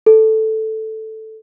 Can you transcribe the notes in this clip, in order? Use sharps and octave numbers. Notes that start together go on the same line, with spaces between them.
A4